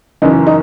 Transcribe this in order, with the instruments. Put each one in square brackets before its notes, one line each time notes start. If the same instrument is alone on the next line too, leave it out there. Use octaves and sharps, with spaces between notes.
[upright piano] F#1 F#2 E3 D#4
D#4